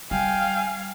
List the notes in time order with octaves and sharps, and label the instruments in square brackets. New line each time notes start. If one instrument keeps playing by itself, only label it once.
[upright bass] G3 [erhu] F5 [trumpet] G5 [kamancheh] G#5